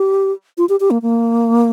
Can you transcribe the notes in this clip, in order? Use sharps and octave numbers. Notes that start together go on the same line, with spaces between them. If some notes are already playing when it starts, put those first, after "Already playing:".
Already playing: G4
F4
G4
G4
A#3
A#3